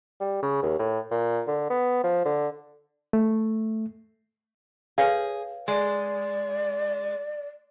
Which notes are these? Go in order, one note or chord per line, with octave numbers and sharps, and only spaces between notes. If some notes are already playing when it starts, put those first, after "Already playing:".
G3
C#3
D#2
A2
A#2
D3
B3
F3
D3
A3
G#4 B4 C#5 F5
G#3 D5